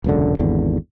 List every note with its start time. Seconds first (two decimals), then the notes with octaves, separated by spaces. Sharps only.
0.04 E1 C#2 F#2 D3
0.39 G#1 E2 D3